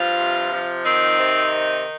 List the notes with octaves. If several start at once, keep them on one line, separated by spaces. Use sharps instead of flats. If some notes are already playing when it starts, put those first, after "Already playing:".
Already playing: G2 F3 F4
C3
F3
D#3 C4 D#4
C3